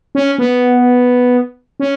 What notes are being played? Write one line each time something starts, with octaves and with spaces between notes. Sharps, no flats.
C#4
B3
C#4